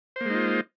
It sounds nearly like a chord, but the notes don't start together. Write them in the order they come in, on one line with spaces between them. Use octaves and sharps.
C5 A#3 G#3 D#4 F4